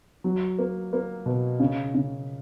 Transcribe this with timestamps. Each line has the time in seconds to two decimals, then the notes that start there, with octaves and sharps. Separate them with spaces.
0.24 F#3
0.59 A#3
0.93 A#3
1.26 B2
1.60 C#3
1.94 C#3